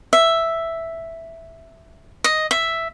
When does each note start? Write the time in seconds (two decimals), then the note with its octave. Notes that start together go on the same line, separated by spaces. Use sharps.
0.13 E5
2.24 D#5
2.51 E5